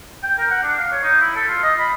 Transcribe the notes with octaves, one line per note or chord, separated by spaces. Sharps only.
G5
A#4
F#5
D4
F5
C#5
D#4
E4
A4
F4
D#5
B5